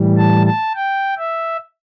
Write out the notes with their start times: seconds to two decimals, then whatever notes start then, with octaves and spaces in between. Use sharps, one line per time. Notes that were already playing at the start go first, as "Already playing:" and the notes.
Already playing: A2 E3 G3
0.18 A5
0.46 A5
0.76 G5
1.18 E5